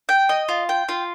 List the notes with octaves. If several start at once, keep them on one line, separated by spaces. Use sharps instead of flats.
G5
D#5
F4
G5
F4